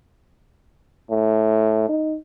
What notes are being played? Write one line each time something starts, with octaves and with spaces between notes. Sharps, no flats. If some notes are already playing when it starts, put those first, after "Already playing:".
A2
D#4